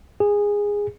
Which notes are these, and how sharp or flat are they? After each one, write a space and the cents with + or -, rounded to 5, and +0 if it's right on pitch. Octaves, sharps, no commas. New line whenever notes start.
G#4 -15